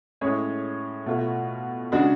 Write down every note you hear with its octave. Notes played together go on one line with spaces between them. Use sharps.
A2 G#3 C#4 G#4 C#5
B2 A3 F4
C#3 G#3 D4 F#4